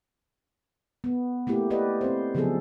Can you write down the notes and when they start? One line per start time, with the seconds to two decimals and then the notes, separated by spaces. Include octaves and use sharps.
1.04 B3
1.47 A3 A#3 E4 G4
1.70 G4 B4 D5 D#5
2.01 C4 C5
2.35 C#3 F3 F#3 B3 G#4 A4